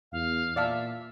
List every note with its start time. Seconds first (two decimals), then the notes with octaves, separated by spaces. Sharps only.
0.12 E2 F5
0.56 A#2 D5 E5 F5 A5